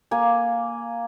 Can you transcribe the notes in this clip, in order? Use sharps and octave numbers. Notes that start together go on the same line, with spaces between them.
A#3 G#5